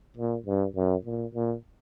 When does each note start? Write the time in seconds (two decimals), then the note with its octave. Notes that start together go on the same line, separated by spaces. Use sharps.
0.17 A#2
0.46 G2
0.75 F#2
1.05 A#2
1.34 A#2